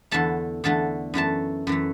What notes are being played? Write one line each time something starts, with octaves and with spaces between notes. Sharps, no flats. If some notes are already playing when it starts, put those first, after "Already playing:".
E2 D3 A3 A5
E2 D3 A3 A5
F#2 E3 A3 A5
F#2 E3 A3